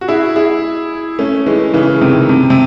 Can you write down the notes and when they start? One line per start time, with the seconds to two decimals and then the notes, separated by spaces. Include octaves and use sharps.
0.01 F#4
0.08 E4 G#4
0.36 E4 G#4
1.19 A3 C#4
1.47 E3 G#3
1.74 C#3 E3
2.01 C3 D#3
2.29 C3
2.50 C3